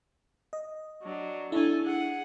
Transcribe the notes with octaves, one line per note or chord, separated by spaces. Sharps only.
D#5
F#3 D4
D4 E4 A4 G#5
G#4 F#5